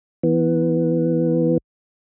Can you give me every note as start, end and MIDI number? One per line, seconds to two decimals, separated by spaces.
0.23 1.58 52
0.23 1.58 59